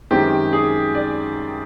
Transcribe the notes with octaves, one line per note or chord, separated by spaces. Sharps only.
F#2 D#3 G#3 C4 G4
G#4
D5